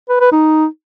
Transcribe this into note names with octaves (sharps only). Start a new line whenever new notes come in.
B4
B4
D#4